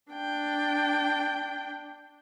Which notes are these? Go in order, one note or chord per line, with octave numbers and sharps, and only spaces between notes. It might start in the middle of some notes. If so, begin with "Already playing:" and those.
D4 G5